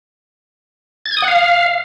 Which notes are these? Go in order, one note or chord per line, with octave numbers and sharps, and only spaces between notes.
A6
G#6
D#6
F#5
F5